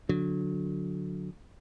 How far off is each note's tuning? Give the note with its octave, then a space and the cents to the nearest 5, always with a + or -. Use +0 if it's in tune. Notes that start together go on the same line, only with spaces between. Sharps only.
D3 -20 F#3 -30